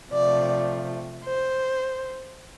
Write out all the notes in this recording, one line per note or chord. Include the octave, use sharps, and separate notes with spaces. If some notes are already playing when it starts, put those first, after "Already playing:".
C3 F3 A3 D5
C5